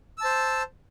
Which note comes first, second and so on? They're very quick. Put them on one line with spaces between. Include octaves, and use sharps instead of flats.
E6 A5 C5